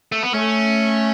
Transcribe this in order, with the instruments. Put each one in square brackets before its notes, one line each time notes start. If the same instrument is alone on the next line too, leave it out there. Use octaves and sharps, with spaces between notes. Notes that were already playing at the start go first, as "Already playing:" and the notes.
[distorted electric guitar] A3
B3
[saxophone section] A3 [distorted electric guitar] C#4